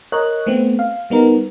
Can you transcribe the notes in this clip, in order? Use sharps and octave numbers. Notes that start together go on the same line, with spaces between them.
A#4 C#5 D#5 F#6
A3 B3 C4
F5
G3 B3 D#4 A#4